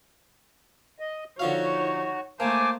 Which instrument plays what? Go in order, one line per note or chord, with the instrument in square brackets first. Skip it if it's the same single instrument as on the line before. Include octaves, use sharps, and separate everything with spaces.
[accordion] D#5
[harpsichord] D3 F3 F5 [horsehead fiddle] D#4 C#5 [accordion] F#4
[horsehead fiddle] A3 C5 [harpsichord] A#3 [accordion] G#5 A5 D6